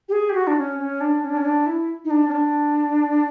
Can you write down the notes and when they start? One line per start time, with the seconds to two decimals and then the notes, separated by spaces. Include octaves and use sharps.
0.09 G4
0.12 G#4
0.29 G4
0.34 F#4
0.47 D4
0.57 C#4
0.79 C#4
1.01 D4
1.23 C#4
1.30 D4
1.37 C#4
1.45 D4
1.66 E4
2.05 D#4
2.10 D4
2.28 C#4
2.32 D4